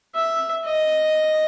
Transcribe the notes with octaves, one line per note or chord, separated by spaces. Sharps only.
E5
D#5